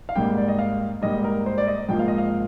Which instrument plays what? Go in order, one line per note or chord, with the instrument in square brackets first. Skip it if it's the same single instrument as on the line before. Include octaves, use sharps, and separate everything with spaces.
[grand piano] F5
G#2 G3 A#3 G5
D5
D#5
F5
G#2 G3 A#3 D#5
A#4
C5
D5
D#5
G#2 F3 A#3 G5
F5
D#5
F5